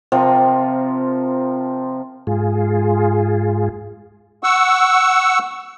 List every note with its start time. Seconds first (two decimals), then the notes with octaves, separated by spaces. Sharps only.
0.12 C3 F3 C4 A#4
2.27 G#2 F4 G#4
4.43 F#5 C#6 E6